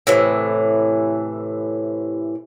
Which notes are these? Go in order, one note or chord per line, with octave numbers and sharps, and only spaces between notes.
A2 C3 E3